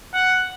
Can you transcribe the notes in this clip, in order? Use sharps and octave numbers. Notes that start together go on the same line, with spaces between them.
F#5